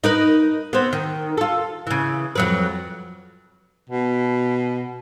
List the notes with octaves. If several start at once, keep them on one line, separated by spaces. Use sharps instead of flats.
D#4 A#4 B4
B3 C4
D#3
F4 A4
C#3 E3
F2 F#3 B4
B2